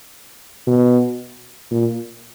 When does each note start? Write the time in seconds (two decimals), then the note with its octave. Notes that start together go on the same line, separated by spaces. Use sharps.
0.67 B2
1.71 A#2